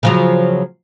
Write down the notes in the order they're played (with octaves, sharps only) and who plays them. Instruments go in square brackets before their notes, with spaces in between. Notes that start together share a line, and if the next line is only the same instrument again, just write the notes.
[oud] C#3 F3 F#3